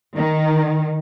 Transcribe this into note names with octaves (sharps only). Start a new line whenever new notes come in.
D#3